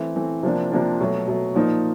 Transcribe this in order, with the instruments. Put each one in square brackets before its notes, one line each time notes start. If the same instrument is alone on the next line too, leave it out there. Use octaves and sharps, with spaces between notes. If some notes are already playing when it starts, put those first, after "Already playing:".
Already playing: [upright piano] E3 A3 C4
E3 A3 C4
C3 F3 A#3 D4
C3 F3 A#3 D4
B2 F#3 A3
B2 F#3 A3
A#2 F3 A#3 D#4